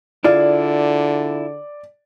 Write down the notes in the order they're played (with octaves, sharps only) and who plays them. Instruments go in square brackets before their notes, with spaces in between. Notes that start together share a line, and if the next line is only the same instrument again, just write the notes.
[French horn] D3 [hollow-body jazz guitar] E4 F4 G#4 [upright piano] D5